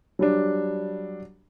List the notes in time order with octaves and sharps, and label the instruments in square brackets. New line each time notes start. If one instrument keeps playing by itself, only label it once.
[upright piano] F#3 G3 D4